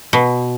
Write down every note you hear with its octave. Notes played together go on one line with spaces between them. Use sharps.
B2